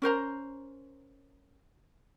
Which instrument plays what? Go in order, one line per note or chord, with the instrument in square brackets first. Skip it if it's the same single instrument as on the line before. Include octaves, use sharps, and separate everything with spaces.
[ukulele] C#4 A#4 C5 A#5